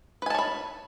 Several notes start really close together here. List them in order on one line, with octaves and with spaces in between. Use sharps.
B4 G#5 A5 C#5 B5